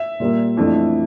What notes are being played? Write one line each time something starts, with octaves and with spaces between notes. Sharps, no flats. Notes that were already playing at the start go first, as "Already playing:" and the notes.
Already playing: E5
A#2 G3 A#3
F2 E3 A3 D4